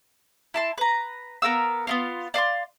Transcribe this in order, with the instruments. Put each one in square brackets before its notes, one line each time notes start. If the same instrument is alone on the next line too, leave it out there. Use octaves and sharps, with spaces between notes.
[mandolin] E4 A5 C6
B4 A#5
B3 A#4 F5 E6
B3 E4 F4
D5 F5 A5 C6